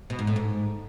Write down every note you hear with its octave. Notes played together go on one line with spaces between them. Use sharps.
B2
G#2
A2
G#2